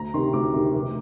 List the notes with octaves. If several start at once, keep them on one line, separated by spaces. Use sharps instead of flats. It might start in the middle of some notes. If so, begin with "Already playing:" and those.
Already playing: D2 A#5
C3 D#3 C6
D2 D6
C3 D#3
F1